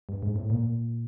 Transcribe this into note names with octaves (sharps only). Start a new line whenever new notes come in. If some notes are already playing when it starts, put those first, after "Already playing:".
G2
G#2
A2
A#2